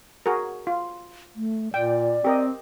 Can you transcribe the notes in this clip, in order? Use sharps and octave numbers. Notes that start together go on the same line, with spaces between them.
F#4 G#4 A#4
F4
A3
A#2 D5 G5
C4 G4 A#4 D#5